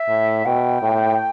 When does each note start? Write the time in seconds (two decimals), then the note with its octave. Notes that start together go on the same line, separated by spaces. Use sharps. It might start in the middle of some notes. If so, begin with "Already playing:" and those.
Already playing: E5
0.09 A2
0.45 B2 G5
0.82 A2